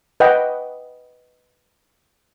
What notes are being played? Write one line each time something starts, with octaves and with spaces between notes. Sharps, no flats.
B4 D#5 F#5 G5